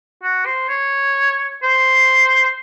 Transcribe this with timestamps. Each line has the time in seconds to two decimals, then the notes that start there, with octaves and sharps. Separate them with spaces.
0.23 F#4
0.46 C5
0.69 C#5
1.63 C5